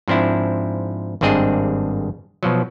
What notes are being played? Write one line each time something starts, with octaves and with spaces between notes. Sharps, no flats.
G#2 F3 C4 D4 E4
G#1 G2 C4 D4 G#4 D#5
B2 F3 F#3